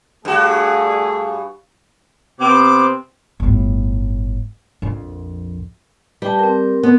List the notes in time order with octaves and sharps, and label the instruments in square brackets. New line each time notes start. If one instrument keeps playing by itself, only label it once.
[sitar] G2 F#4 [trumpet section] A3 G#4
[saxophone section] C3 B3 C4 [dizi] D6
[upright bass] G1 A2
A#1 F2
[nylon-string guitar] G3 [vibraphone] B4 G5 A5
[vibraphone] C4 A#4
[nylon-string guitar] B3